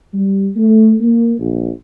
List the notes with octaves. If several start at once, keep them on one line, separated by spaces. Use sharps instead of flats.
G3
A3
A#3
A#1